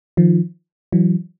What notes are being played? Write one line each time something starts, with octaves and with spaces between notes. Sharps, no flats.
D#3 F3
E3 F#3